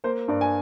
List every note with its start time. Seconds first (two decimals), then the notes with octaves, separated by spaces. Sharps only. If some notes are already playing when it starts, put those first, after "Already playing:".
0.04 A#3 C5
0.28 G2 D5
0.41 G#5